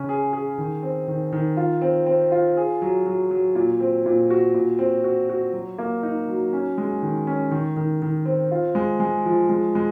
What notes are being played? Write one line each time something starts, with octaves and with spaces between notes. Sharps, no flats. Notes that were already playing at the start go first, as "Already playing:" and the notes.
Already playing: C#3 C#4
G#4
G#4
D#3
C4
D#3
D#3
F4
C4
C4
F4
G#4
F#3
F#3
F#3
A#2
C4
A#2
F#4
A#2
C4
F#4
F#4
F#3
A#3
D#4
F#3
C#4
G#3
D#3
C#4
D#3
D#3
D#3
C4
F4
G#3
G#3
F3
G#3
G#3